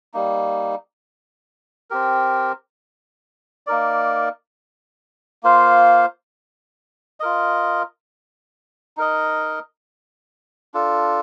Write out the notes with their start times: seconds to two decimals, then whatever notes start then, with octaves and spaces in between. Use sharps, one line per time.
0.14 G3 A#3 D#4
1.91 C4 G4 A#4
3.67 A#3 D#4 A#4 D5
5.43 A#3 F4 C5 F5
7.20 F4 A#4 D#5
8.97 D#4 A#4 D#5
10.74 D4 F4 A4